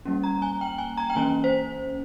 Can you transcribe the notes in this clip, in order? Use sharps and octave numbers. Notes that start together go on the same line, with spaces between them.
G3 A#3 C#4
A#5
G#5
G5
G#5
A#5
G5
E3 A#3 C#4 G#5
C5